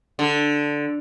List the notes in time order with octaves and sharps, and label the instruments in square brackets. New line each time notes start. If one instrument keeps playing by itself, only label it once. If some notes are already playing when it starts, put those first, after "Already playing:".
[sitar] D3